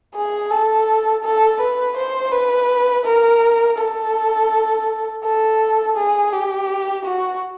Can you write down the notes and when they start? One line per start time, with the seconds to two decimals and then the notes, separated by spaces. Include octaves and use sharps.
0.15 G#4
0.51 A4
1.24 A4
1.61 B4
1.97 C5
2.32 B4
3.05 A#4
3.78 A4
5.24 A4
5.97 G#4
6.33 G4
7.05 F#4